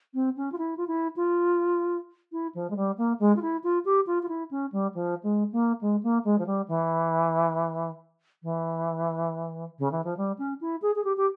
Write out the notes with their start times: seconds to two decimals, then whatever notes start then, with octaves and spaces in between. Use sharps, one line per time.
0.14 C4
0.37 C#4
0.52 F4
0.58 E4
0.77 F4
0.87 E4
1.16 F4
2.32 E4
2.55 F3
2.70 G#3
2.76 G3
2.98 A#3
3.19 G#3
3.36 F4
3.42 E4
3.64 F4
3.85 G4
4.07 F4
4.23 F4
4.28 E4
4.51 C#4
4.72 G3
4.94 F3
5.23 G#3
5.52 A#3
5.81 G#3
6.03 A#3
6.24 G#3
6.38 F3
6.46 G3
6.68 E3
8.43 E3
9.79 C#3
9.91 E3
10.04 F3
10.17 G3
10.38 C#4
10.61 E4
10.82 G#4
10.95 G#4
11.04 G4
11.17 G4